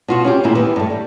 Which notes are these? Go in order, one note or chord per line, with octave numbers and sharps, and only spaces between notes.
B2 F4 F#4
C#4 F4 G4
D#2 A#2 G#3 E4
E3 B3 G4
G2 A3
G3